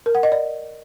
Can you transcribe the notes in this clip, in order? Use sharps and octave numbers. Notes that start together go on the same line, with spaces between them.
A#4
F#5
D#5
D5